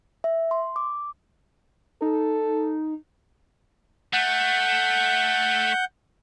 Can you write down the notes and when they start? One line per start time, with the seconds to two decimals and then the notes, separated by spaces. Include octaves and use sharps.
0.24 E5
0.51 C6
0.76 D6
2.02 D#4 A4
4.13 A3 F#5 G6